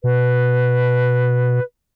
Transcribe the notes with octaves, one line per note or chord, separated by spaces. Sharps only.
B2 B4